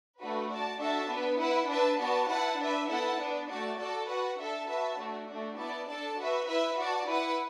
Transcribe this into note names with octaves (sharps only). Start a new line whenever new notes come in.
A3 D4 F#4 B4
F#4 D5 A5
D4 F#4 A4 E5 A5
B3 D4 B4
E4 B4 F#5
D4 B4 E5 A5
B3 F#4 D5 A5
E4 B4 F#5 A5
D4 B4 E5
B3 E4 A4 F#5 A5
B3 D4 B4
A3 F#4 D5 A5
F#4 A4 D5 A5
F#4 B4 F#5 A5
D4 A4 E5 A5
F#4 B4 E5 A5
A3 D4 F#4
A3 D4 F#4
B3 E4 D5 A5
D4 A4 D5 A5
F#4 B4 E5
E4 B4 E5
F#4 D5 A5
E4 B4 F#5